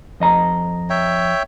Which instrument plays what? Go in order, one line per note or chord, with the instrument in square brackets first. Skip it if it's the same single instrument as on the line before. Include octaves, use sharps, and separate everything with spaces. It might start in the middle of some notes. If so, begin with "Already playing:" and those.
[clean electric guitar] F2 D#5 A#5
[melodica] C#5 E5 G5